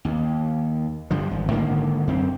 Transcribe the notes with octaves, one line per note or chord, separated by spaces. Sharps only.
D#2
G2 D3 F3
G#1
G#2 D3 D#3 A#3
F#2 C4